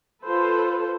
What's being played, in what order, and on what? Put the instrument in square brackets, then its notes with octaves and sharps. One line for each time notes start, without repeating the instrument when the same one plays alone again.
[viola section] F4 A4 B4 C5